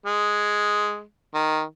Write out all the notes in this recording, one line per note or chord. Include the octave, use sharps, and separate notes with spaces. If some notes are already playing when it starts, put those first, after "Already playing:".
G#3
D#3